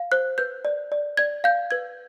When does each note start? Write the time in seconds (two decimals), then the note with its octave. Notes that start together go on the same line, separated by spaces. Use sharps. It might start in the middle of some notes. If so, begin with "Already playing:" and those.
Already playing: F5
0.12 C5 F#6
0.38 B4 G6
0.65 D5
0.92 D5
1.17 D5 G#6
1.44 F5 G6
1.71 B4 G#6